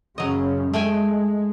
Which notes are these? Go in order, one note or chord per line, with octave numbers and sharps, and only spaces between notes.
F#2 C#3 F#3 D#5
G#3 A3 G5 G#5